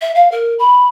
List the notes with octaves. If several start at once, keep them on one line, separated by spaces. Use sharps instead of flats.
E5
F5
A#4
B5